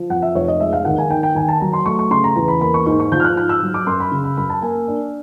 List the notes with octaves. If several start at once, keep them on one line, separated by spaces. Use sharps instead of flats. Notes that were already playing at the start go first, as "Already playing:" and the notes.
Already playing: F3
F2 F#5
E5
F1 C#5
D#5
G#3 E5
F5
D#2 F#5
G#5
D#3 G5
G5
D#2 G#5
A5
F#3 A#5
C6
A3 C#6
C#6
C#3 C6
A#5
E2 A#5
B5
A#3 B5
C#6
G#2 C#6
C#6
F3 G6
F6
F#6
G#2 F#6
E6
F#3
D6
F#2 C6
B5
C#3
B5
F#2 B5
A5
A#3 G#5
D4